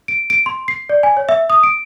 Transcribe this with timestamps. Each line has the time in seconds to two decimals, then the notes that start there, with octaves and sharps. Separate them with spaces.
0.08 D7
0.30 D7
0.46 C6
0.68 C7
0.89 D5
1.03 G#5
1.17 C#5
1.29 E5
1.50 D#6
1.63 D7